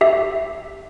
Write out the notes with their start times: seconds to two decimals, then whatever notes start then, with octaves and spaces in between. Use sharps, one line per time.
0.01 G4 E5